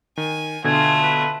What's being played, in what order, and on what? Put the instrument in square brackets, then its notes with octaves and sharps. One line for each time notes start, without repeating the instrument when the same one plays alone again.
[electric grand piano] D#3 [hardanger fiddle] G#5
[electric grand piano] B2 D3 [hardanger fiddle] A3 F4 [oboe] G#5
[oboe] B4